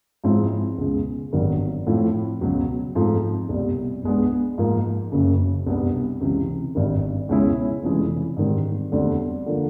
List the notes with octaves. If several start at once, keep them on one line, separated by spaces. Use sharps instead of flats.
G#2 F3 G#3 C4 E4
C#2 B2 G#3
G#1 G2 D#3 F#3 B3
A2 F3 A3 C4 E4
C#2 B2 F#3
G#2 F3 A3 C4 D#4
C2 B2 G3
B1 B2 G#3 B3 D4
G#2 F3 A#3
F#1 F#2 C#3
C2 B2 G3 B3 D4
C#2 C3 E3
G#1 G2 D#3
C#2 B2 G#3 C#4 E4
F1 F2 C#3 E3 G#3
G#2 D#3 G3 C4
E1 D2 D3 G3 C4
D3 F3 A#3